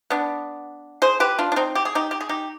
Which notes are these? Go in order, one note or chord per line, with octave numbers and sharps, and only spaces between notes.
B3 D4
G#4 C5
G4 B4
D4 F4
D4
C4 D#4
G4
G#4
D#4 G4
G4
G#4
D#4 G4